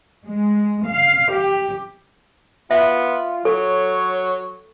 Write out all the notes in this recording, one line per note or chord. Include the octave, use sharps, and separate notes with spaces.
G#3
F5
G4
B3 F4 E5
F#3 A4 C#5